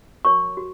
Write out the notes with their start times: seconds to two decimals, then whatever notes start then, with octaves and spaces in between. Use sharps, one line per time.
0.25 F#4 A#4 C#5 C#6
0.57 F#4